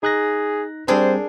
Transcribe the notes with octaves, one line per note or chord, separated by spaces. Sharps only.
D#4 G#4 F#6 A#6
G3 C4 D4 G#4 A#4 C5